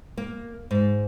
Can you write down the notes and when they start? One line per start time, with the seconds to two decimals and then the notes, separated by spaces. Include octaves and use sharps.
0.18 A#3
0.71 G#2